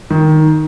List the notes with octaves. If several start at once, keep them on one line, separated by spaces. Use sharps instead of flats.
D#3